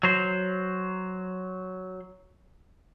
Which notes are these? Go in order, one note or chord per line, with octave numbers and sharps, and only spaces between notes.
F#3 C5